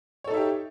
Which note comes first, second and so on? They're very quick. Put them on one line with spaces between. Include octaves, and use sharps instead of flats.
C#5 A4 D#4 E5 G4